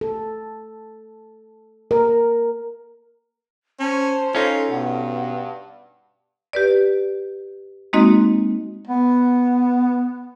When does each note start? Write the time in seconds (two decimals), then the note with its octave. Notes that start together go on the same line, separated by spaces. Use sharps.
0.01 A4
1.91 A#4
3.80 C#4 C5 A5
4.35 C#4 D#4 F4 A4
4.71 G2 B2 F#5
6.53 G4 B4 D5
7.93 G#3 A#3 C4 D#4 F#4 D#5
8.87 B3